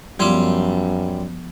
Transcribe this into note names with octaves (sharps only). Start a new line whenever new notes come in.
F#2 F3 G3 B3 F4 E5